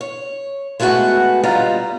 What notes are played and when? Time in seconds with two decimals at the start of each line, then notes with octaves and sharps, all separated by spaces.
0.01 C#5
0.80 G#3 A3 B3 F#4 F#5
1.43 A#2 G3 B3 F4 D#5 A#5